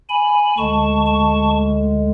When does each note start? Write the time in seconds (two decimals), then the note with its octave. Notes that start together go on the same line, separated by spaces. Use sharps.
0.09 G#5 B5
0.58 D2 D3 G#3 A5 C#6
1.06 A5 C#6